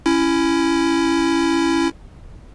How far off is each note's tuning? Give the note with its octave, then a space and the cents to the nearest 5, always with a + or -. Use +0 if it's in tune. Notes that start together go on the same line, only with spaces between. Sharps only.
C#4 +0 E4 +15